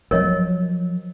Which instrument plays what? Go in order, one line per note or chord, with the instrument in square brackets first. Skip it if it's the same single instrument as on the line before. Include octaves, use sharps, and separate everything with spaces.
[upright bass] F3 F#3 [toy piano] A#4 C#5 D#5